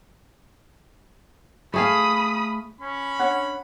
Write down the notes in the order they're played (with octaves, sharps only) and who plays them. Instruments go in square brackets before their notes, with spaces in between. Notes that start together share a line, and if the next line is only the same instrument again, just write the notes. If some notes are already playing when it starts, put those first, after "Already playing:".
[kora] A3 G#4 F5 [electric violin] B5 D#6
[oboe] C#4 [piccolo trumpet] B5
[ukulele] D4 C#5 [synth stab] F#5